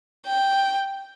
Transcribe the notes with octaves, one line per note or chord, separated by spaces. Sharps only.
G5